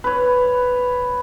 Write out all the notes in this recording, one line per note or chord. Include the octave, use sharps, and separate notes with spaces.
B4 C#5